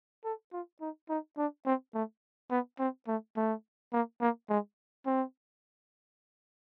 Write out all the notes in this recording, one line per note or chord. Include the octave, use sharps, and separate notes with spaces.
A4
F4
D#4
D#4
D4
C4
A3
B3
C4
A3
A3
A#3
A#3
G#3
C4